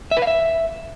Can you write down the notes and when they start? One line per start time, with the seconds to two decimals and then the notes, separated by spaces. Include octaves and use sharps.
0.11 E5
0.17 B4
0.22 F5
0.27 E5